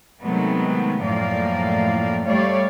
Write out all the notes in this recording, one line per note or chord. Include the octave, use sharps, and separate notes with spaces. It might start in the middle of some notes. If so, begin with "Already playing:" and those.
C3 D#3 F#3 G#3 A3 B3
F#2 A2 F3 A#3 D5 F5
G3 A3 C#5 D5 F5